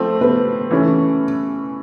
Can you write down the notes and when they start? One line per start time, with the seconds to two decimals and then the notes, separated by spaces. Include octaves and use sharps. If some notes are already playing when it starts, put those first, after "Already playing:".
Already playing: F3 A3 C4
0.21 B4
0.71 E3 A3 C#4